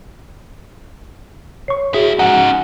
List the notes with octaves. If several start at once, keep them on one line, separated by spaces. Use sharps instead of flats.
C#5 C#6 C7
G3 F#4 G#4 E5
C#4 D#4 F#5